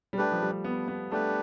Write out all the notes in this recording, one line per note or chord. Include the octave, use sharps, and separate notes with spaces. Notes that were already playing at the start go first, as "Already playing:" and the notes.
G3
A3 D4 G4 B4
F3
G3
B3
B3
A3 D4 G4 B4